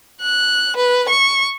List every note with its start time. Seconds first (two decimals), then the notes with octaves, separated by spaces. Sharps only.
0.21 F#6
0.76 B4
1.09 C#6